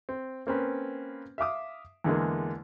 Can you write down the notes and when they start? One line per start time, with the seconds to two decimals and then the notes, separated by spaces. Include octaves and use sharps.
0.09 C4
0.47 A#3 C4 C#4 B4
1.38 E5 F5 D6 D#6
2.04 E2 D3 G#3 A#3